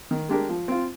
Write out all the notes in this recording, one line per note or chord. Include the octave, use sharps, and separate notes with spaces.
D#3
G#3 D4 G4 A#4
F3
C4 F4